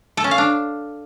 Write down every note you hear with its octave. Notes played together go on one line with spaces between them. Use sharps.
A4
C#4
F5
D4